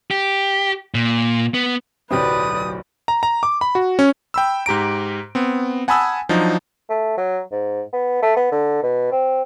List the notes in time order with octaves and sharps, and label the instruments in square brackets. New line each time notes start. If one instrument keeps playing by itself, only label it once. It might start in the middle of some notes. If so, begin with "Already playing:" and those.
[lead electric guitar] G4
A#2
B3
[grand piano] D1 B1 [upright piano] F#3 G4 C5 [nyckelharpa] B4 D5 [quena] D#6
[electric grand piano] A#5
A#5
D6
B5
F#4
C#4
G5 B5 E6
G#2 G4 A#5 D7
B3 C4
F#5 G#5 A5 B5 D#6 E6
F3 F#3 D4 D#4
[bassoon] A3
F#3
G#2
B3
A3
B3
D3
B2
C4